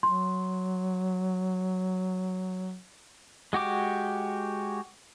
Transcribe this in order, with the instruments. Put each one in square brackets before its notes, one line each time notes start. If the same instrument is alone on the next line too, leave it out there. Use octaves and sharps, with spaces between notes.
[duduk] F#3 [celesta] C6
[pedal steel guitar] G#3 F#4 G4 D6